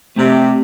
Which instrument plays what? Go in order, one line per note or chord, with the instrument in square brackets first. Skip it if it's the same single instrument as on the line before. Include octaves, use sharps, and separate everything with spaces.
[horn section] C3 [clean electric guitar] A3 C4 G4 D5